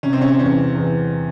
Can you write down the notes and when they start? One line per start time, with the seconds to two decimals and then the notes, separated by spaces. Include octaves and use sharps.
0.03 C3 C#4
0.13 C4
0.21 C#4
0.39 E2 C#4
0.75 E2